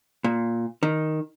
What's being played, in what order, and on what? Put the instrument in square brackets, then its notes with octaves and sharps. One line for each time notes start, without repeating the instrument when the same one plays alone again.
[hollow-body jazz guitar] A#2
D#3